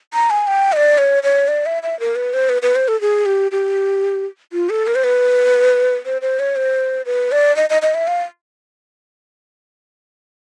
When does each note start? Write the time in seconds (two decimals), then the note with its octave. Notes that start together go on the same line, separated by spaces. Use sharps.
0.13 A#5
0.30 G#5
0.47 G5
0.72 D#5
0.77 D5
0.98 C#5
1.23 C#5
1.48 D5
1.66 E5
1.83 E5
2.00 A#4
2.16 B4
2.34 C5
2.49 B4
2.62 B4
2.75 C5
2.88 A4
3.01 G#4
3.26 G4
3.52 G4
4.53 F4
4.70 A4
4.87 A#4
4.95 C5
5.04 B4
6.06 C5
6.22 C5
6.39 C#5
6.56 C5
7.06 B4
7.32 D5
7.56 D#5
7.70 D#5
7.82 D#5
7.94 E5
8.07 F5